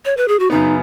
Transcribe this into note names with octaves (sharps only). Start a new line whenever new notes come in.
C#5
B4
G#4
F#4
F#2 C#3 B3 D#4